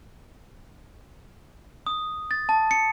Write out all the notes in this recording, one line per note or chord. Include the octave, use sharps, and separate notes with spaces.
D#6
A6
A5
C#7